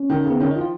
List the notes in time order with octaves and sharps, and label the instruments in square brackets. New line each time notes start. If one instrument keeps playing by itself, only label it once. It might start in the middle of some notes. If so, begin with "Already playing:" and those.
Already playing: [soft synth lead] C#4
[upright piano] D#3
C#3
[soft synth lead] B3
[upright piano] D#3 [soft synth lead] C#4
[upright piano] F3 [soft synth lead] D#4
[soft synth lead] F4